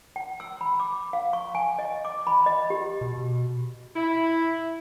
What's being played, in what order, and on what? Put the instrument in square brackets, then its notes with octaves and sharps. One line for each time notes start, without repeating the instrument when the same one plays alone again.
[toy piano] G5
E6
B5
D6
F5
C#6
G#5
D#5
D6
B5
D#5
G4
[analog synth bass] B2
[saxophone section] E4